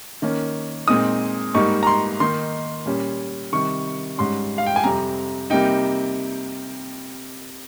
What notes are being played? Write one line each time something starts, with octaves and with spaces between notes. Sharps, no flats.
D#3 A#3 C#4
A#2 G#3 C4 D#4 D#6
G#2 G3 A#3 D#4 C#6
A#5
C6
D#3 A#3 D#4 C6
A#2 G3 C#4
C3 D#3 G3 C#6
G#2 G3 C#4 C6
F5
G5
G#5
F2 C3 G3 C4 A#5
C3 G3 A#3 D#4 G5